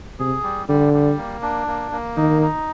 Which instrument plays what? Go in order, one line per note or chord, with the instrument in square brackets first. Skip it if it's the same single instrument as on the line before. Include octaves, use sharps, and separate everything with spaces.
[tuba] C3 [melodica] G#4
[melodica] G3
[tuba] D3 [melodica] G3
[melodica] G3
A#3
D4
A#3
A#3
[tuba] D#3 [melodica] D#4
[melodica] D#4